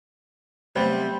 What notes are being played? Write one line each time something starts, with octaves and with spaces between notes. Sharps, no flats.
C3 F#3 G3 A3 B3 C4 C5